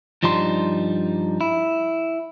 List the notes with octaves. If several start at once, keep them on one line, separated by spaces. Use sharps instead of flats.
G2 F3 G3 D#4 C6
E4